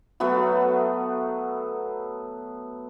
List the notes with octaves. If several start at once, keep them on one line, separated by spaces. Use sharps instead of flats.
F#3 A3 B3 F#4